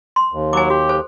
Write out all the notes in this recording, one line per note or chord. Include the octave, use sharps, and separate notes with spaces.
C6
D#2
F#3 G#5 D6
F#4 G4
A4 C5